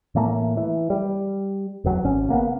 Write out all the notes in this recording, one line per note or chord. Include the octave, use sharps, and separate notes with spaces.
A2 E3 A3 A#3
E3
G3
F#1 E2 F#3
G#1 C#4
C#3 A#3 B3